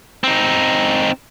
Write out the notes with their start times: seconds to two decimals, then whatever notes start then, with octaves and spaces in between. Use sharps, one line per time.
0.24 C4 D#4